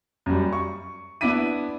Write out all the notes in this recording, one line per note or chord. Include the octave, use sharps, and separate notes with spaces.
F#2 G3
C#6
B3 D4 E4 D6 B6 D#7